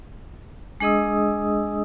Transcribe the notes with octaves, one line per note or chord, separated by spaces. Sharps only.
G#3 D4 G#4 D#5 D#6 E6